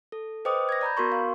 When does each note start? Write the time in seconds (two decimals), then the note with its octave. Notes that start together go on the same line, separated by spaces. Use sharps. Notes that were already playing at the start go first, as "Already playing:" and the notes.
0.12 A4
0.45 B4 C5 D#5 G5 D6 D#6
0.69 G#6 A#6
0.81 D5 A#5 B5 G6
0.97 B3 F#4 A#4 C6 C#6
1.12 F5